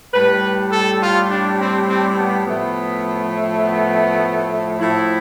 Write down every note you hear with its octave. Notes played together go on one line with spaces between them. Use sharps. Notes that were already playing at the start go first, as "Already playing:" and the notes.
A2 G3 B4
A4
F4
D4
C4
C4
B3
A2 F3 A3 B3
B3
A2 F3 A3 E4